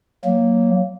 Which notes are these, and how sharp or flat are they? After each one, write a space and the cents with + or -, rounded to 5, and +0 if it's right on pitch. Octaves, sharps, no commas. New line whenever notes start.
F#3 +0 A#3 +0